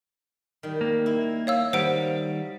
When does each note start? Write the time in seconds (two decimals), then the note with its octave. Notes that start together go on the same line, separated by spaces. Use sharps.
0.63 D#3 G3
0.81 A#3
1.06 E4
1.47 C#5 F5 E6
1.73 D#3 G3 C5 F#5 D7